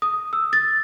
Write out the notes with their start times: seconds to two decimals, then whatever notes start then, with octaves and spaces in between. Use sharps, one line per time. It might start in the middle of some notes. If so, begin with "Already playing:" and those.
0.02 D#6
0.33 E6
0.53 A6